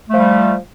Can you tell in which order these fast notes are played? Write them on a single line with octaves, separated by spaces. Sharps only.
A3 F3 G3